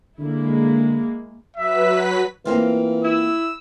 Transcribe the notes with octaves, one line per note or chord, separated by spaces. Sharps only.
D3 G#3 A#3 E4
F#3 B4 E5 B6
E3 A#3 C4 F4
E4 E6